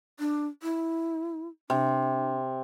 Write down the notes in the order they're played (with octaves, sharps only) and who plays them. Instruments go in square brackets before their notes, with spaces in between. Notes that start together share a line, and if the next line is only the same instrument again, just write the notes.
[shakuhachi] D4
E4
[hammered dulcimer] C3 [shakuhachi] D4